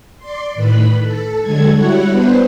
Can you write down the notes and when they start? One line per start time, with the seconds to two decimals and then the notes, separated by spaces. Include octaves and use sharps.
0.18 D5 C6
0.55 A2 D#3 B4 B5
1.02 A4
1.41 D3 F#3 G#3 A4 G#6
1.71 G3 E4 F#4 C#5 F#5
2.11 B3 D4 B4 C5